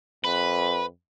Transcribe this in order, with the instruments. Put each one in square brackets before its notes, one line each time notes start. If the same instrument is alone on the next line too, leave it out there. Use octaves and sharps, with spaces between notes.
[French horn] F2 [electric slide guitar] B4